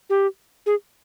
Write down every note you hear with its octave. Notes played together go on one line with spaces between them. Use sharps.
G4
G#4